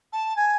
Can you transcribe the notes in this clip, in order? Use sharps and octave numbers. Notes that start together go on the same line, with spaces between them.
A5
G#5